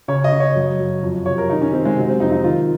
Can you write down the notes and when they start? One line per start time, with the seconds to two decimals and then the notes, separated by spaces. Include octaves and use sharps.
0.08 C#3 C#5
0.24 D#5
0.32 C#3
0.40 C#5
0.55 F#2
0.79 F#2
1.03 F2
1.26 C3 C#5
1.38 A#4
1.49 D#3 D#4
1.61 C#4
1.73 D#3 C4
1.85 G#3
1.97 C3 F#3
2.09 C4
2.20 F2 D#4
2.32 D#4
2.44 D#3 F4